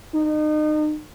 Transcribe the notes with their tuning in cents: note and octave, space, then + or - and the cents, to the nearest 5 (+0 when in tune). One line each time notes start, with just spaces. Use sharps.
D#4 -35